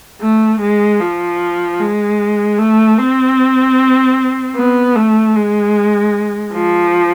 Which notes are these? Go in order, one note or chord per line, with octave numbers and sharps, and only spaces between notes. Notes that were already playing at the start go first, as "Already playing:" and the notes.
A3
G#3
F3
G#3
A3
C4
B3
A3
G#3
F3